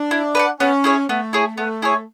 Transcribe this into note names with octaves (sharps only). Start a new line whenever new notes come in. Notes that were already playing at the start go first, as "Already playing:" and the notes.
Already playing: D4
E4
B4 D5 F#5
B3 C#4
E4 G#4 C#5
A3 B3
E4 G#4 C#5
A3 B3
E4 G#4 C#5